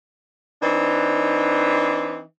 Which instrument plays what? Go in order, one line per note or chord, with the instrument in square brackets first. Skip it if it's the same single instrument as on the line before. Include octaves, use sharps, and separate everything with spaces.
[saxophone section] E3 C4 D4 D#4